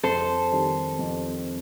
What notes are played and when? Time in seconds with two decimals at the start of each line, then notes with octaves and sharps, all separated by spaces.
0.03 F2 A4 C5
0.52 D#3 G3 C4 G4
0.99 F2